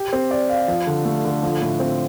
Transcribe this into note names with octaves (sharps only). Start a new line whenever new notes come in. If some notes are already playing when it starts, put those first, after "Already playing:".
Already playing: G4
C4
D5
F5
F3
D3
A3
D3
F3
A2
C4